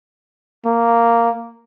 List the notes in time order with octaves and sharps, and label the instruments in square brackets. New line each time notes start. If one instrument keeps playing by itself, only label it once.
[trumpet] A#3